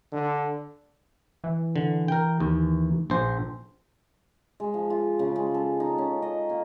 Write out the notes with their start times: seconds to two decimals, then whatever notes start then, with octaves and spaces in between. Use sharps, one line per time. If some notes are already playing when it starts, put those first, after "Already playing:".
0.13 D3
1.44 E3
1.76 D3
2.08 A#4 G5
2.40 D#2
3.10 A#1 C5
4.60 G#3
4.74 F3
4.90 F4
5.19 C#3
5.36 G#3
5.54 A4
5.80 D#4
5.98 C#4
6.22 D#5
6.49 A#3